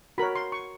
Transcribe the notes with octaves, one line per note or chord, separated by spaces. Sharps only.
F#4 A#4 C#5 B5
C6
C#6